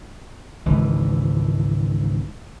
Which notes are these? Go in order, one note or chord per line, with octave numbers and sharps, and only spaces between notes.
G#1 C#2 E3